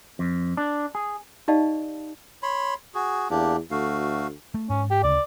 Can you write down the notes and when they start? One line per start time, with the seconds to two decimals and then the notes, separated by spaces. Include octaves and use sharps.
0.19 F2
0.57 D4
0.95 G#4
1.48 D#4 G4 D5 D#5 F5 A5
2.43 C#5 B5 C6
2.94 F#4 G#4
3.30 E2 A#3 D4 G4
3.71 D2 A3 F#4 F5
4.54 A3
4.70 G#2 C#4
4.90 G4
5.03 D2 C#3 D5